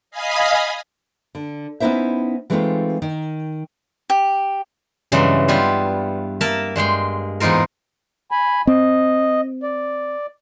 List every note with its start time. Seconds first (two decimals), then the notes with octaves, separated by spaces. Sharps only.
0.11 D#5 F5 G#5 B5 D#6
1.35 D3
1.80 B3 C#4 D#4 E4 C5 E5
2.50 E3 G#3 A3 C4 D#4 F4
3.02 D#3
4.10 G4
5.12 G2 C#3 E3 F#3 G#3
5.48 G3 B3 E4 F4 G4
6.41 A#3 A#4 E5 A5
6.76 G2 G#3 G5 C6
7.40 E2 G#2 D#4 F4 A#4
8.31 G#5 B5
8.67 C4 D#5
9.63 D5